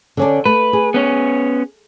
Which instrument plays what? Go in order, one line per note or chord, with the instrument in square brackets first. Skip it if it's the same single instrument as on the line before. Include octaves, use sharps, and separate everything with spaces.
[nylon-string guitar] D3 C#4 D4
[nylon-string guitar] A3 [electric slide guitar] B4
[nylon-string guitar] G#4
[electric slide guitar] B3 C#4 C#5